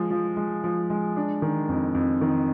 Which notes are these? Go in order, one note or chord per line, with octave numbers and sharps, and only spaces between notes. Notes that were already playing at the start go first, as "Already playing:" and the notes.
Already playing: F3 G#3
F3
G#3
F3
G#3
D4
D#3
F2
F2
D#3